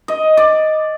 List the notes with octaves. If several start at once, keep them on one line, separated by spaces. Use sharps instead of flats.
D#5
D5